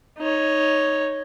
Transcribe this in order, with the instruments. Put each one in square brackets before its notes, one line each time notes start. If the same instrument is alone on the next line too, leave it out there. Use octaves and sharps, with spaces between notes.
[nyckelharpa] D#4 C#5